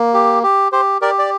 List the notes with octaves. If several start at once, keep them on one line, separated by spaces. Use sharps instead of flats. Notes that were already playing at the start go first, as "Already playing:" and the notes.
Already playing: A#3
G4
G4
G4 C5
G4 A#4 D5
D5